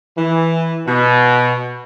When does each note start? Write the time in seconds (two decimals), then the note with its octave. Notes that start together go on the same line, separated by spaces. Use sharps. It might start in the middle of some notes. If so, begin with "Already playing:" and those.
0.18 E3
0.86 B2